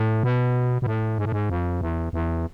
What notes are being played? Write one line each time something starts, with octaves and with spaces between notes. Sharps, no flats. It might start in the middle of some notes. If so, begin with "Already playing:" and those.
Already playing: A2
B2
B2
A2
G#2
A2
G#2
F2
E2
E2